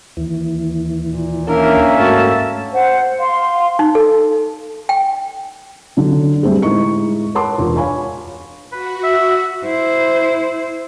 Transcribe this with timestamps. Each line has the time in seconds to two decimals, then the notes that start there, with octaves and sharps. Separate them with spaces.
0.17 D#2 E3
1.03 A#2
1.48 A#3 C#4 D4 A#4 E5
1.99 G#2 A3 F#4 A5
2.72 C5 F#5
3.19 F5 C6
3.79 D#4
3.95 A4
4.89 G5
5.97 D3 F#3 D4 A4
6.43 G3 A3 C4 D4 G#4
6.62 A2 G#3 D#4 D#5 C#6 C#7
7.35 C#5 F#5 A5 B5 C6 D6
7.58 E1 D4 F4 A#4
7.76 C#5 F5 G#5 B5 C#6
8.72 F#4 B4
9.03 E5
9.65 E4 C5